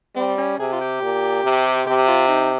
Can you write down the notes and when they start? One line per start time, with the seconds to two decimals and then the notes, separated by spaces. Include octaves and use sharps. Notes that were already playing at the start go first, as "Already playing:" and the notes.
0.16 G3 C4
0.38 C#4
0.59 C3 G#4
0.72 F4
0.81 G4
1.02 A#2
1.44 C3
1.87 C3 G4
2.08 F4
2.28 D#4